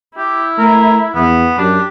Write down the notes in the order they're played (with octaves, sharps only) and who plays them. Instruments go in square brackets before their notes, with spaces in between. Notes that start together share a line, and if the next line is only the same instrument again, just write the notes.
[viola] E4 [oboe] G4
[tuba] A3 [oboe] A#4
[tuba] E2 [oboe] B3
[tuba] F#2 [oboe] D4 [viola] G4